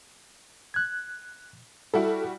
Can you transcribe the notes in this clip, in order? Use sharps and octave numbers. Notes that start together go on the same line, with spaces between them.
F#6 G#6
G3 E4 F#4 A4